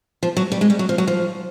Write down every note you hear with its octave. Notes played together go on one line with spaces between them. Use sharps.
F3
F#3
G3
G#3
G3
F#3
F3
F#3
F3